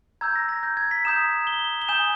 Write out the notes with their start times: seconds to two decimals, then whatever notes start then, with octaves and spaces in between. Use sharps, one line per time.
0.21 A#5 E6 G6 G#6
0.36 A#6
0.49 A#6
0.63 G6
0.77 G#6
0.91 B6
1.05 A#5 D#6 G6 E7
1.47 G7
1.82 G7
1.88 G#5 D#6 G6 E7